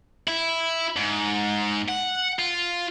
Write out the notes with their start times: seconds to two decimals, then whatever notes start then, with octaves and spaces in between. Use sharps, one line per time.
0.28 E4
0.96 G#2
1.88 F#5
2.39 F4